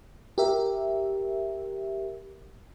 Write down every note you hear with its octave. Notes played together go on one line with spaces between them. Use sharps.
G4 A#4 E5